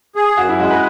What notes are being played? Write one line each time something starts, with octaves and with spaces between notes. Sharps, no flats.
G#4
F#2 F#4
E4
G#3 F#4
B4